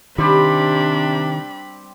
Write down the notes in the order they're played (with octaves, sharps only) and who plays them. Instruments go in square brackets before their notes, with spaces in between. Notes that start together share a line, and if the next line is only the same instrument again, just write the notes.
[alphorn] C3 [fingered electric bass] D#3 [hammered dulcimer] G3 C4 G4 [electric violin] D4 B5